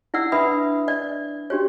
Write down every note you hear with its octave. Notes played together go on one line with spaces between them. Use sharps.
E4 D5 F#5 E6
D4 B4 E5 F#5 B5 D#6
D5
D4 F#4 G4 C#5